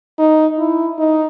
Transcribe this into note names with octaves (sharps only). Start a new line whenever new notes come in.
D#4
E4
D#4